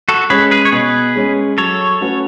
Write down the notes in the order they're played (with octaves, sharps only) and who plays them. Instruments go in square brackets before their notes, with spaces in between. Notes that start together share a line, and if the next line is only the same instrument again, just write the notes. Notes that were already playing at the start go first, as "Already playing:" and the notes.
[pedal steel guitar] F#4 A4
[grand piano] G#3 C#4 [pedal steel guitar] G#4 B4
[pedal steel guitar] G#4 B4
C#5
[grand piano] B2 [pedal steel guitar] G#4 B4
[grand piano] G#3 C#4
[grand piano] F#3 [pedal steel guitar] A4 C#5
[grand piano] A3 C#4 F#4 B4